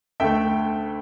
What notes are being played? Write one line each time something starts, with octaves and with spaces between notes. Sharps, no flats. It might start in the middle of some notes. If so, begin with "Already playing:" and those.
D2 D3 A3 E5 G5